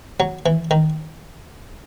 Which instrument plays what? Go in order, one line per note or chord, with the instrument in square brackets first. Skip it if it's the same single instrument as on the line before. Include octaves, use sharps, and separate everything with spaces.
[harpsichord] F#3
E3
D#3